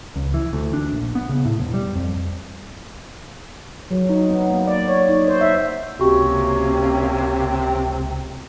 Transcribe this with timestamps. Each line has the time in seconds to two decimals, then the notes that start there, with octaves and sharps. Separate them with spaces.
0.16 C#2
0.34 E3
0.53 D2
0.73 D4
0.91 A#1
1.15 B3
1.29 C#3
1.45 A2
1.60 E1
1.74 G3
1.95 F2
3.91 F#3
4.09 D#4
4.30 B3
4.51 A#3
4.67 D5
4.88 C#5
5.09 D#4
5.28 C5
5.41 E5
5.99 C#2 C3 A#3 C#4 F#4 G4 C#6